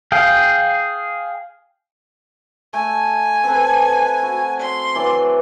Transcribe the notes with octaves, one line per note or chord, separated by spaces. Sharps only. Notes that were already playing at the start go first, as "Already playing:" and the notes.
G#4 F5 G5
A3 G#5
C4 A4 B4
F#4
C6
E3 F#3 D5